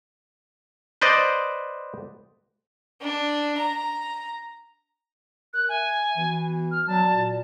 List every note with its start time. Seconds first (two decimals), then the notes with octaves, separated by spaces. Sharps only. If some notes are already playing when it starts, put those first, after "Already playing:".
1.02 B4 C5 D5 D#5
3.01 D4
3.58 A#5
5.54 A#4 F#6
5.69 E5 G#5
6.17 E3 B3 F#4
6.71 F6
6.87 F#3 F#4 D5 A5
7.12 A#2